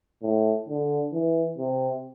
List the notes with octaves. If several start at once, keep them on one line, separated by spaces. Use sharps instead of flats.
A2
D3
E3
C3